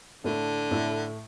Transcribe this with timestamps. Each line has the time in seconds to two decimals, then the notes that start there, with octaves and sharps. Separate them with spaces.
0.24 A2 D3 A3 E4
0.71 A2 A3 E4